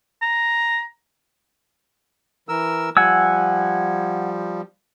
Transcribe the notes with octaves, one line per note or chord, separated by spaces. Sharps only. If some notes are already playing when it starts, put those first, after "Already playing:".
A#5
E3 A#4 E6
F3 G3 F#5 G#5 E6